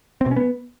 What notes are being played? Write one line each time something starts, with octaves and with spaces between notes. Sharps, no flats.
C4
B2
C#4
B3